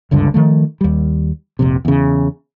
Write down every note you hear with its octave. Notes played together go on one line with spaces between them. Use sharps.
F#1 C#2 G2 D3
D#3 F3 A3
D#2 G3
F1 A#1 C3
E2 C#3